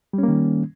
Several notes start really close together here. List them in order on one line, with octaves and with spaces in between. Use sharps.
G3 C#4 A#3 D#3